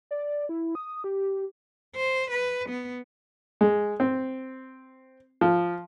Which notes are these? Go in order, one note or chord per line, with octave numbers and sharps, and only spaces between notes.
D5
E4
D#6
G4
C5
B4
B3
G#3
C4
F3